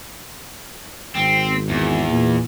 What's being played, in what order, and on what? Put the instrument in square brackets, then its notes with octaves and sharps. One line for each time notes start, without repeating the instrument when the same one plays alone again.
[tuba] G#1 [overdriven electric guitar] C4
[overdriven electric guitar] E2
[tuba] A#2